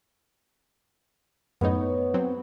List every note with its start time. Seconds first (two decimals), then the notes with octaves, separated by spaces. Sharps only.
1.61 F#2 A2 B3 D#4 C#5
2.14 F#3 C4